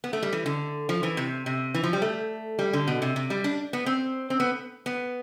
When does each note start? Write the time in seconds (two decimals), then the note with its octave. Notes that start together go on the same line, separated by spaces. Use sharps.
0.04 B3
0.13 A3
0.23 G3
0.33 E3
0.46 D3
0.89 F3
1.03 E3
1.17 C3
1.46 C3
1.74 E3
1.84 F3
1.93 G3
2.02 A3
2.59 G3
2.73 D3
2.87 B2
3.02 C3
3.16 C3
3.30 G3
3.44 D4
3.73 B3
3.86 C4
4.30 C4
4.40 B3
4.86 B3